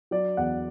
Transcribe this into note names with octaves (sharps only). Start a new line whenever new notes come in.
F#3 D5
E2 F#5